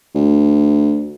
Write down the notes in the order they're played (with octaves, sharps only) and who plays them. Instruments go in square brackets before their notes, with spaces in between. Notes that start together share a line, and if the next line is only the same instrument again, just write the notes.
[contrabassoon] D2